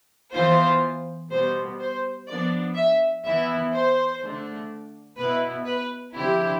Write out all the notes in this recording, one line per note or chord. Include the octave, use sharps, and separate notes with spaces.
E3 B3 F4 C5
B2 G3 B3 C5
C5
F3 B3 D4 D5
E5
E3 B3 E4 E5
C5
D3 A3 D4
B2 B3 E4 B4
B4
D3 F3 C4 E4 G4